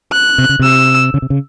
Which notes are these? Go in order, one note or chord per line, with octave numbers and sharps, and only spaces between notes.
F#6
C3
C#3
C3 E6
C#3
C3
C#3